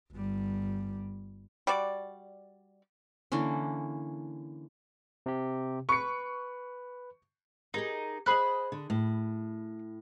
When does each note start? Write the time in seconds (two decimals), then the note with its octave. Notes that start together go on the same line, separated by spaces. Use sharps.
0.12 G1 G3
1.67 G3 F#4 D5
3.32 D3 E3 A#3 C#4
5.26 C3 G4
5.89 B4 C#6 C#7
7.74 D#4 G4 G#4 A#4
8.26 G#4 C5 D#5 B5 F#6
8.72 D3
8.90 A2